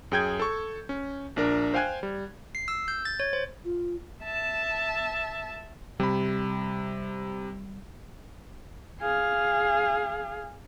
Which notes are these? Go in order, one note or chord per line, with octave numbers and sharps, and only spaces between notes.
F#2 G#4 G5 G6 G#6
A4 C#6
C#4
A#1 D4 A#4
C5 F5 G5 G#5 F#6 G#6
G3
C7
E6
G6
A6
C#5
C5
F4
E5 A5
C3 G3 B5
G#4 F5